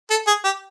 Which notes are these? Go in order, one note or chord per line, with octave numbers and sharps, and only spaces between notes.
A4
G#4
G4